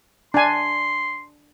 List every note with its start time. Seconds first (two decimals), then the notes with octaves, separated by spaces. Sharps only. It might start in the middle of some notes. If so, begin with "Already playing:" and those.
0.34 D4 G#5 C6